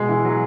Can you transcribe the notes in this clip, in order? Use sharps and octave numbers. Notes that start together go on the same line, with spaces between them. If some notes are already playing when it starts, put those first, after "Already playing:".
Already playing: B2 G#3
E3
F#3